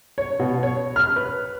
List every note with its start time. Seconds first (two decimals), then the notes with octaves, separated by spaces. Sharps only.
0.18 C#5
0.39 B2
0.63 C#5
0.96 F6
1.16 B4